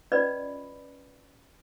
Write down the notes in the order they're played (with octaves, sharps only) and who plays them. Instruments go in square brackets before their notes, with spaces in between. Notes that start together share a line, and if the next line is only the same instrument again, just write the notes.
[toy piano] C#4 F4 B4 D5 D#5 B5